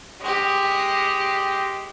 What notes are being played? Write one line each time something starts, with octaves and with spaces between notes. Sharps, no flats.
G#3 G4